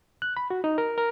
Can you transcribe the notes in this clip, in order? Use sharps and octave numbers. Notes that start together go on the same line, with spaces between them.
F#6
B5
F#4
D#4
A#4
A#4